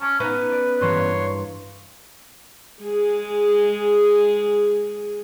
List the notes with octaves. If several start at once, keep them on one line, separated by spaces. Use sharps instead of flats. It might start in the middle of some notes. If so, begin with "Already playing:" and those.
C#4 A5 D6
B3 C#4 D#4 B4
D5
G2 E3 A#3 C#5 C6
G#3 G#4